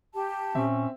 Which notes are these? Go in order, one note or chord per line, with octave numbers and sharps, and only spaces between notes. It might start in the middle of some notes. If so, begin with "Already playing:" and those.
G4 A5
A#2 C4 C#4 E5